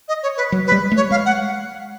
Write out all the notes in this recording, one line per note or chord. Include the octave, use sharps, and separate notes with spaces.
D#5
C#5
B4
F#3
B4
G3
A3
C#5
G#3 F5
F#5